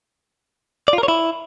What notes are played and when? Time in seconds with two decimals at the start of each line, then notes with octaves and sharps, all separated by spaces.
0.88 D5
0.93 F4
0.98 A#4
1.03 C#5
1.08 E4